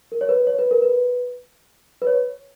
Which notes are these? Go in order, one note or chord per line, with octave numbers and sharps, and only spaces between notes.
A#4
C#5
B4
C#5
B4
A#4
B4
B4
C#5